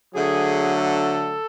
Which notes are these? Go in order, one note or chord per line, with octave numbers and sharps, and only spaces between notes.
D3 F#3 A3 G#4
A4